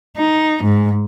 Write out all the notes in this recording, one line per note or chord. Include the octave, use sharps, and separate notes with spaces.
D#4
G#2